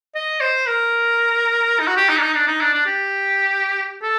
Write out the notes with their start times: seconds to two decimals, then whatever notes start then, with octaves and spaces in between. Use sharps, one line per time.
0.15 D#5
0.41 C5
0.66 A#4
1.80 D#4
1.88 F#4
1.96 G4
2.09 D#4
2.17 D4
2.21 D#4
2.35 D4
2.48 D#4
2.61 D4
2.73 D4
2.86 G4
4.02 A4